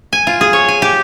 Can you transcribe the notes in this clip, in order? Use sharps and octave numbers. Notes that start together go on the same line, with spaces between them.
G#5
F4
G#4
C#5
G#5
G4